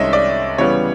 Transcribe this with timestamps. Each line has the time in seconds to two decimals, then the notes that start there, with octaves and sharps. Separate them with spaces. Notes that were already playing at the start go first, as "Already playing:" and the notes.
Already playing: C2 C3 D#3 G#3 C#4 D#5 E5
0.13 D5
0.58 C#3 E3 G3 B3 C#5